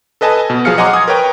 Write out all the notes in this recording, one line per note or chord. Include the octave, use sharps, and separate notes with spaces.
A4 B4 D#5 G#5 A5
B2
F3 F#3 G#4 F5 F6 C#7
D#5 F#5 G#5 A#5 C6 D6
D#6 G#6
A#4 B4 C#5 G5 A#5